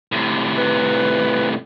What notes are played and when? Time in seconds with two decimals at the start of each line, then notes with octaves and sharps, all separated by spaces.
0.12 A2 C3
0.56 B4